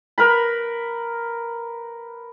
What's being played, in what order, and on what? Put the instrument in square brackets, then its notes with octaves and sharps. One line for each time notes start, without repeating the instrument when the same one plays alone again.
[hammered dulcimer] A#4 B4 B5